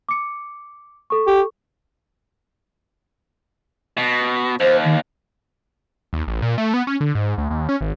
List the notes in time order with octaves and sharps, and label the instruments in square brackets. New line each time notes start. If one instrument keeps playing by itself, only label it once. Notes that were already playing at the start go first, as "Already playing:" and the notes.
[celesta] D6 C#7
A4 C#6
[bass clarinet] G4
[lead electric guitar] B2
[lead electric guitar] D#2 [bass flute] C5
[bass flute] D#3
[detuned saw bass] D#2
A1
A#2
A3
B3
C#4
D3
G#2
D2
D#2
C#4
G#1